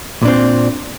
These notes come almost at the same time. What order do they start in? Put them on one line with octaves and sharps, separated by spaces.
A#2 D4 C4